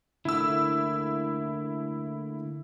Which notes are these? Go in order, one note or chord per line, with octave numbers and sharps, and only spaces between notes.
D3 A3 A#3 E4 E6